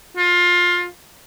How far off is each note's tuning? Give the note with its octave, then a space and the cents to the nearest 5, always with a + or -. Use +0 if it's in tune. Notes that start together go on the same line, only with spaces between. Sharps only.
F4 +20